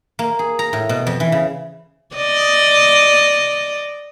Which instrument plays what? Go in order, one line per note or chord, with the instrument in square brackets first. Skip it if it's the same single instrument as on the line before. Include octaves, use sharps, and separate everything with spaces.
[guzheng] A#3
G#4
A#5
A2
B2
F2
E3
C#3
[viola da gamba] D5 D#5